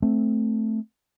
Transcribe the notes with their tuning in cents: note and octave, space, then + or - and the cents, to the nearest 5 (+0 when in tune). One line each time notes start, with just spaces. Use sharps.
A3 +0 C4 +0